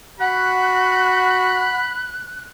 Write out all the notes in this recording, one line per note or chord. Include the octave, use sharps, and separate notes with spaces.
F#4 F#5 B5 F#6